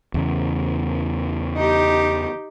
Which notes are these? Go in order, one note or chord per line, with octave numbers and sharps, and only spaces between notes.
E2 C#3
D#4 G4